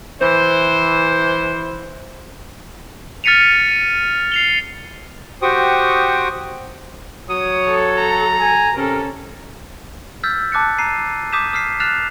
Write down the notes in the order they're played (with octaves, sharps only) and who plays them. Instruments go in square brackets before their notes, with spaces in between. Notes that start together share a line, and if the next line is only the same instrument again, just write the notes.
[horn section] E3 C5
[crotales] F6 A6 B6 C#7 D#7 F7
D#7
C7 F7 G7
[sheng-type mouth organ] F#4 G4 C5 G5 C#6 D#6
[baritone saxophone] F#3 [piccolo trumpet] C#5 [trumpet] D#6
[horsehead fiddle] A4
[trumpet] A#5
[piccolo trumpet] G#5
[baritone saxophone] C3 [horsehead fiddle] C#4 A4 [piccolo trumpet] A#4
[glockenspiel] E6 F6 G6 A6 B6
A5 D6 F#6 A6 C#7
A#5 C7 D#7
D6 D#6 G6 B6 D#7 E7
D#6 F6 B6 C7
F6 F#6 A6 C7 E7 F7